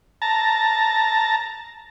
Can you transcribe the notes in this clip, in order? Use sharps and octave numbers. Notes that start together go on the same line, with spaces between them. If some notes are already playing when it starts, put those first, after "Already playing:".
A5 A#5